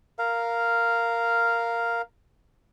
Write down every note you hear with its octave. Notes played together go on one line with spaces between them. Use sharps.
A#4 F5